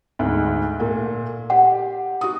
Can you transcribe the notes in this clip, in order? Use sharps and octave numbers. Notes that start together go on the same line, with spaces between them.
D2 G#2
A#2 A3
G4 F#5
F#4 D#6